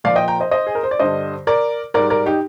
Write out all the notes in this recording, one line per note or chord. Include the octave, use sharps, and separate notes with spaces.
A#2 F3 D5 F5
D#5 G5
G5 A#5
C5 D#5
C5 D#5
G#4
A#4
C5
D5
G2 D3 G3 C5 D#5
A#4 D5
G#2 G3 A#4 D5
A#4 D5
D#4 G4